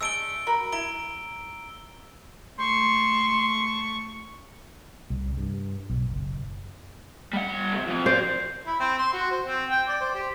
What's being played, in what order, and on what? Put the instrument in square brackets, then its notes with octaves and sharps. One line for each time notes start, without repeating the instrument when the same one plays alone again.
[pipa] G#3 A3 D4 [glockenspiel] E6 D7 G7
[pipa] F#4 A#4 B5
[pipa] E4 [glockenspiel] A#5 D7 G7
[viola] A3 C#6 [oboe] C6
[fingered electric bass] C2
G2
B1
F#1
[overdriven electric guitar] G3 F#5
C#2 C3
F3 C4
[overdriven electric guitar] A#4 D5 [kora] C5
[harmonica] E4
C4
C6
F#4
C5
C4
G5
D5
C5
G4